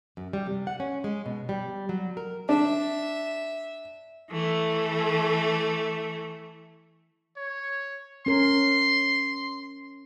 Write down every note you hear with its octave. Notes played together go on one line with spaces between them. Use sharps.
F#2
G3
C3
F#5
C#4
G#3
B2
G3
F#3
A#4
D4 E5
E3 A3
C#5
C#4 A#4 C6